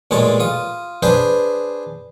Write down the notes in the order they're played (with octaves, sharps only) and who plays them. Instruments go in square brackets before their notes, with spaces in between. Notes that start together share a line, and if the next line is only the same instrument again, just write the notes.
[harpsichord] A1 A#2 G#3 C#5 A5
F4 D#6
D4 G#4 B4 C5